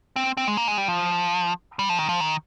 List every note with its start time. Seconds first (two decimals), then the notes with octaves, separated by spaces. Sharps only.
0.16 C4
0.37 C4
0.47 G#3
0.57 A#3
0.68 G#3
0.78 G3
0.88 F3
1.79 G3
1.89 F3
1.99 D#3
2.09 F3
2.20 D#3